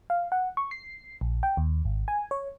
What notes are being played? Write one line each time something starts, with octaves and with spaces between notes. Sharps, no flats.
F5
F#5
C#6
C7
A#1
G5
D#2
G#1
G#5
C#5